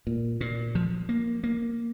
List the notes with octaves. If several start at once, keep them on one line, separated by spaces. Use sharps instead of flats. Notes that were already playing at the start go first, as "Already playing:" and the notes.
A#2
A#2
F3
A#3
A#3